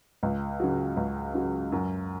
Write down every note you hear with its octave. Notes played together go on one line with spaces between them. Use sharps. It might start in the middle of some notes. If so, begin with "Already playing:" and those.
C#2
C#3 F#3
C#2
C#3 F#3
F#2